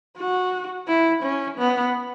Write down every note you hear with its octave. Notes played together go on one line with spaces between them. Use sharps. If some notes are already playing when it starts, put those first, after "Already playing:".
F#4
E4
C#4
B3